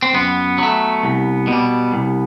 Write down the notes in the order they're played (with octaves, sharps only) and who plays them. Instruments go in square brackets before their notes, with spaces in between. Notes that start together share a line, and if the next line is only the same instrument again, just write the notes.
[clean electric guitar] C4
F#2 B3
F#3 A3
C2
B2
G3
C2